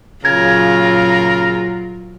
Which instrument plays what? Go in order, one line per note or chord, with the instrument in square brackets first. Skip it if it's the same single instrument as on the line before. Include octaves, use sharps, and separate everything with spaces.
[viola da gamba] A#2 F#3 F4 [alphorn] C#3 [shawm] A#4 [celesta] G#6